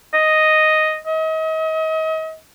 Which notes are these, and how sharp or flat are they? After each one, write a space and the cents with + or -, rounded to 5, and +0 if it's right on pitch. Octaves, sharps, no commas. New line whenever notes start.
D#5 +0
D#5 +35